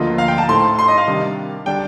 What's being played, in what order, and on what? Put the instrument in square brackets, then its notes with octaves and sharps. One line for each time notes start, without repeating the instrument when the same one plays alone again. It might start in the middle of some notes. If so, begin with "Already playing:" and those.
Already playing: [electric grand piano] D2 D3 F3 A#3 F4 [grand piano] D#5
[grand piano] F5
G5
A5
[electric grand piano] A2 A3 D#4 A4 C5 [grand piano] C6
[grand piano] C6
D#5
F5
[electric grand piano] C3 D#3 G3 D4
[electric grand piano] D3 G3 D4 [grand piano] G5